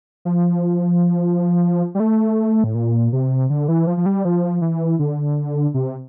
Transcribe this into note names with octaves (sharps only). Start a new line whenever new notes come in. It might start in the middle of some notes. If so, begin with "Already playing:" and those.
F3
G3
A3
A2
A#2
C3
D3
E3
F3
F3
G3
F3
E3
D3
C3